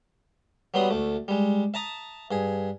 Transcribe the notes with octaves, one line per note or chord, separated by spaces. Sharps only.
F#3 G3 B3 C6 D#6
D2 A3
G3 G#3
E5 A5 A#5 D#6
G2 G#4